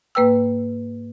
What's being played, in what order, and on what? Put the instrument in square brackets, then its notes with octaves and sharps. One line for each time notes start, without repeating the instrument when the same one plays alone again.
[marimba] G#2 A#3 B4 G5 E6